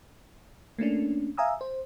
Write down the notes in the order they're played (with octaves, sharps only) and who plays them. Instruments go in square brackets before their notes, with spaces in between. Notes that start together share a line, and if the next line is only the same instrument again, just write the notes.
[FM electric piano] A3 A#3 C#4 D4
E5 F5 G#5 A#5 D#6 E6
C5